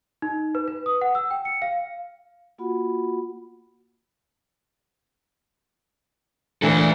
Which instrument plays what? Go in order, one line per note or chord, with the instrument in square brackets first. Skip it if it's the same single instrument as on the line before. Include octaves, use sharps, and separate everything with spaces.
[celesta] D#4
B4
B4
D#6
F#5
E6
G5
C#7
F5
[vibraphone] A#3 F4 F#4 F#5 B5
[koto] A#2 E3 [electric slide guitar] A3 D4 A4